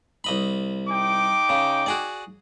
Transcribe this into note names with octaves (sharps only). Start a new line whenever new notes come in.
C2 D#5 B5
D#4 G5 D6
C#3
F#4 G#4 D5